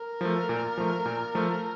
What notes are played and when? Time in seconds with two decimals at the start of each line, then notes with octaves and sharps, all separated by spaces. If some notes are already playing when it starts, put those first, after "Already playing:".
Already playing: A#4
0.21 F3 A3
0.49 A#2
0.77 F3 A3
1.06 A#2
1.35 F3 A3